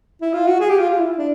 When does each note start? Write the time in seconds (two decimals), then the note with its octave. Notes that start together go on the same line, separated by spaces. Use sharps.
0.21 E4
0.33 F4
0.47 F#4
0.60 G#4
0.69 G4
0.79 F4
0.89 F4
0.98 E4
1.18 D4